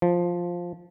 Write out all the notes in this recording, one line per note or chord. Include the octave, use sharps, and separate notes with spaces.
F3